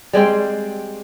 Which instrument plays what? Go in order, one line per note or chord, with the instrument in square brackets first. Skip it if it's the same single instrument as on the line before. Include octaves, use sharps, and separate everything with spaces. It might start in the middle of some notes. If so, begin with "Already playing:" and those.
[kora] G3 G#3 C4 G5